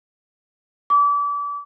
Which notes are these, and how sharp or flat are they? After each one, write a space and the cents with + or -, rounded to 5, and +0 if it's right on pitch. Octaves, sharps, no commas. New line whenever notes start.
D6 -30